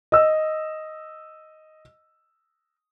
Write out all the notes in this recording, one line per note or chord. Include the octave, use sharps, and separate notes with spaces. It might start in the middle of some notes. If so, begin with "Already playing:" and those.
D#5 E6